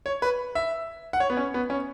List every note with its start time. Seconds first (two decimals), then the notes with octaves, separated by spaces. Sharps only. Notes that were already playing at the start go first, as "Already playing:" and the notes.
0.06 C#5
0.22 B4
0.55 E5
1.13 F#5
1.20 C#5
1.30 B3
1.37 C#4
1.54 B3
1.70 C#4